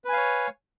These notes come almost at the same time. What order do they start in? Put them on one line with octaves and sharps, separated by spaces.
B4 G#5 F5 C#5